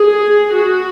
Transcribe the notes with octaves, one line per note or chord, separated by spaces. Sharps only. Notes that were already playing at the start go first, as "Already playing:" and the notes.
Already playing: G#4
F#4